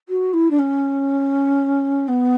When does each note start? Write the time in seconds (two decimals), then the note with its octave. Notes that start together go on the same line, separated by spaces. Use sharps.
0.08 F#4
0.33 E4
0.50 D4
0.59 C#4
2.08 B3